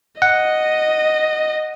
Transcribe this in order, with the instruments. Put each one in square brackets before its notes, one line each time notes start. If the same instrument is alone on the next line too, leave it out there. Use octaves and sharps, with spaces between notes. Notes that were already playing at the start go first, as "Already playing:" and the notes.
[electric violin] D#5 [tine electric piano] F#5